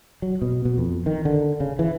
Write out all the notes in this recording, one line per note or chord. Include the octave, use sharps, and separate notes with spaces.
F#3
B2
B2
F2
D#3
D3
C#3
E3